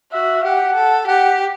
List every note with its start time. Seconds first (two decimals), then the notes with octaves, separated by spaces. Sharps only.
0.12 F#4 E5
0.43 G4 F#5
0.75 A4
1.07 G4 F#5